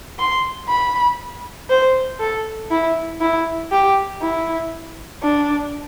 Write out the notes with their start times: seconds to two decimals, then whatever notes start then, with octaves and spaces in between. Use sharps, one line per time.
0.19 C6
0.69 B5
1.70 C5
2.20 A4
2.71 E4
3.21 E4
3.72 G4
4.22 E4
5.22 D4